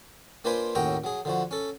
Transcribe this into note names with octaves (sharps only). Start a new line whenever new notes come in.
A#3 D4 F4 B4 C5 G#5
D#2 A2 C#4 F#4 G5 A#5
F#3 G#4
D3 F3 F#4
C#4 A4